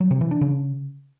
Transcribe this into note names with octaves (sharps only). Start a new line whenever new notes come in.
F#3
C3
E3
D4
C#3